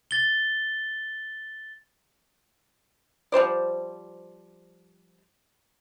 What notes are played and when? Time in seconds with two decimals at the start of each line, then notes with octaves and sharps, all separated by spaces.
0.11 A6 G7
3.32 F3 G3 C5 D5